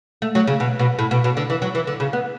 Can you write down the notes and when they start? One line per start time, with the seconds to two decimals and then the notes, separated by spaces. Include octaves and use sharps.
0.22 A3
0.35 F#3
0.47 C#3
0.60 B2
0.79 B2
0.99 A2
1.11 B2
1.24 B2
1.37 D3
1.50 E3
1.62 F#3
1.75 E3
1.87 D3
2.00 C#3
2.13 B3